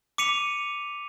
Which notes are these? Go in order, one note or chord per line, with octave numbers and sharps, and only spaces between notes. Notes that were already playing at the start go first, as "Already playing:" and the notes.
D6 B6 C#7 D#7 F7